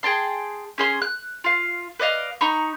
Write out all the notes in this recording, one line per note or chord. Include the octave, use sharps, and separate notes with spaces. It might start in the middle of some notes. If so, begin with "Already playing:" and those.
G#4 G5 A5 C6
C#4 G#4 C6
F#6
F4 F5
B4 D5 D#5 F5
D#4 A#5 B5 C#6